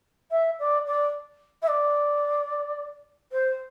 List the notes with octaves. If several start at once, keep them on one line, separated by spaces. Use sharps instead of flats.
E5
D5
D5
E5
D5
C5